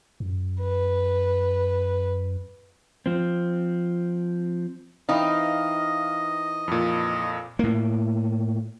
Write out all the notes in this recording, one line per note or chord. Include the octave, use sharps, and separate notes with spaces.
F#2
B4
F3 C4
E3 C4 D#4 D#5 F5
F2 A#2
A2 A#3